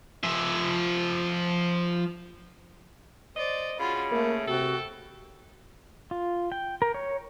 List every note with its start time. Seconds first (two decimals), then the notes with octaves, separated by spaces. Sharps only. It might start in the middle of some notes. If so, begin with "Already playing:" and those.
0.24 F3 E5
3.36 C5 D5 D#5
3.79 C#3 F4 F#4 B5
4.11 A3 A#3
4.47 C3 F#4 A4 G5
6.11 F4
6.52 G5
6.82 A#4
6.94 C#5